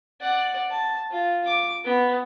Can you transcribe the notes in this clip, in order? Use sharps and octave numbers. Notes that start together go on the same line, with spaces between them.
D5 F#5
A5
F4
D6
B3